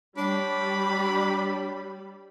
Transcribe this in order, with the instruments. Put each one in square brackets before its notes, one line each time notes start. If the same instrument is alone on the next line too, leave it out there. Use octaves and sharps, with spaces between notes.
[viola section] G3 [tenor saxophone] D4 [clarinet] C#5 [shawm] B5